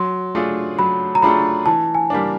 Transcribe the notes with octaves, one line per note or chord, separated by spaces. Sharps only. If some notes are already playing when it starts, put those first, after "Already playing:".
Already playing: F#3 C6
A3 D4 F4 G#4
F#3 B5
A#5
A3 D4 F4 G#4 B5
E3 A5
G#5
G3 A#3 D4